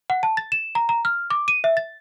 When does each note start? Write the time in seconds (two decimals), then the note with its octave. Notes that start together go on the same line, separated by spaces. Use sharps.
0.10 F#5
0.23 A5
0.37 A6
0.52 E7
0.75 A#5
0.89 A#5
1.05 F6
1.30 D6
1.48 D#7
1.64 E5
1.77 A6